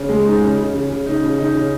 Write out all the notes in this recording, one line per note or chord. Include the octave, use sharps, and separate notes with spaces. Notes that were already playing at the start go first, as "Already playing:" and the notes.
Already playing: C#3
G#3
D#4
C#3
C#3
C#3
C#3
D#4
C#3
D#4
C#3